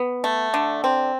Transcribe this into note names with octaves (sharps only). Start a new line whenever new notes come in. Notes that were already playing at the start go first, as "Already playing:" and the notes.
Already playing: B3
A3
D3
C4